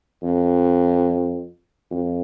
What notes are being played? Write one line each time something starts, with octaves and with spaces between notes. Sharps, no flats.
F2
F2